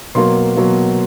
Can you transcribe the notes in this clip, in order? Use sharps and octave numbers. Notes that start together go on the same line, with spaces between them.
B2 F#3 A#3 C6
B2 F#3 A#3